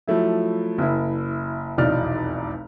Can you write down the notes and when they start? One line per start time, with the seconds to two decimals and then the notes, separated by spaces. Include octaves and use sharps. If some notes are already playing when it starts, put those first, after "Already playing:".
0.07 F3 F#3 A3 E4
0.78 F#1 E4
1.78 F1 B1 E2 D#4 D5 F6